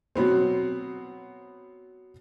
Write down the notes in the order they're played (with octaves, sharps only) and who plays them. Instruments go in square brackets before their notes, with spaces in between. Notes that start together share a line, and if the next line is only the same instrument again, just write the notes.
[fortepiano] B2 F#3 B3 C4